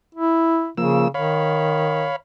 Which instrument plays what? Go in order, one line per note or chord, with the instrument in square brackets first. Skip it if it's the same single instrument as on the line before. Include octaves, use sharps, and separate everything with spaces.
[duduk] E4
[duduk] C#3 [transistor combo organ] F3 A#3 E6
[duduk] D#3 [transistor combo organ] C#5 F5 B5